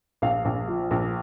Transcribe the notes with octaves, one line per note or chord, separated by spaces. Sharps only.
A#1 F5
A#1
F3
A#1